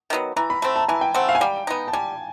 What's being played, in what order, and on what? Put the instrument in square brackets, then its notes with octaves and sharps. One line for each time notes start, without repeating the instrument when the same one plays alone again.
[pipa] D#3 F#3 B3
[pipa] E3 [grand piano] A#5
[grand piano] B5
[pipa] A3 C4 [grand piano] B5
[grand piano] A5
[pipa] E3 [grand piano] G#5
[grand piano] G5
[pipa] A3 C4 [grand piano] F#5
[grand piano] F5
G#5
[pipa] G3 [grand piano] G5
[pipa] B3 D#4
[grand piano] A5
[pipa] G3 [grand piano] G#5